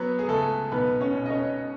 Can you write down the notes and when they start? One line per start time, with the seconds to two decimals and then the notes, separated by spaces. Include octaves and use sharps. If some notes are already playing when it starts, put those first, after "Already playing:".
Already playing: F#3 B3 B4
0.19 G#4
0.28 C#2 A3 A4
0.72 B1 B3 B4
1.00 C#4 C#5
1.15 B2
1.26 D#5
1.30 C#4 C#5